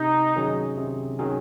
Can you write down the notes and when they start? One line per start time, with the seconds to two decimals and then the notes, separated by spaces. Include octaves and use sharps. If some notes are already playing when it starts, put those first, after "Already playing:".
Already playing: C3 D#4
0.36 D#3 F#3 C#4 G#4
0.77 C3
1.19 D#3 F#3 C#4 G#4